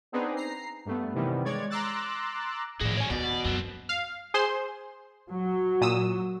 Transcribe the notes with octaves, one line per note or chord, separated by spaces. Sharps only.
B3 C4 D4 D#4 G#4 B4
A#5 C7
G2 A3 B3
C3 D#3 E3 G3 B3
G#3 C#5 D5 G#6
A#5 C6 D6 E6 F#6 A6
A2 F3 F#4 G#4 D5
C#5 G#5
D#2 B3 F#4 D5
F#2 C4 D4
F5
G#4 C5 C6
F#3
A#2 D#6 E6